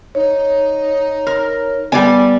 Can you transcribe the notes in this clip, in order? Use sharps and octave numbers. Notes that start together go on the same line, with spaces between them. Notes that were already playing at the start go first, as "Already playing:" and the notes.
D#4 C#5
A#4
G3 B3 D5 G#5